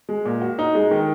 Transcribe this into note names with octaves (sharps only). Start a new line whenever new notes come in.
G#3
A#2
F#4
D#4
G#3
D#3